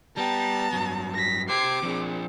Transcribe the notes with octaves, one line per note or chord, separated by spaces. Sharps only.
G3 B3 G4 A5 A#5
G2 F#3
A#6 B6
G4 C5 D6 G#6 C7
F3 C4 D4 G#4